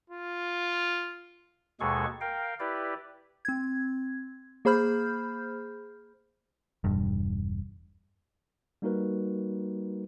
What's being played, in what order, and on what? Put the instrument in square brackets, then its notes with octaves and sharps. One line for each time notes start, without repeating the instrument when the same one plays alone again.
[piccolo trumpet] F4
[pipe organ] D#2 B2 G#3 G#4 A4 C#6
A#4 F5 G5
E4 G4 B4 D5
[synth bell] C4 G#6
A#3 G#4 C5 B5 F6 G6
[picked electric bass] E1 G2
[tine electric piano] G3 A#3 D#4 F#4 A#4 B4